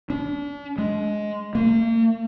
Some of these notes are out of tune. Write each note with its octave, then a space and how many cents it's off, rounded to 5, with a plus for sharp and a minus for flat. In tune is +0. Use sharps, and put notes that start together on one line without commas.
D4 -40
G#3 +15
A#3 -40